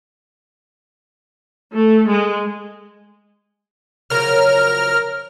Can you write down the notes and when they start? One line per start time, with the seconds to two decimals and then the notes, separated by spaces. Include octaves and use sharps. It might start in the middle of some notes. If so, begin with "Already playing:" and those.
1.74 A3
2.08 G#3
4.10 C#3 F3 F#3 A#4 F6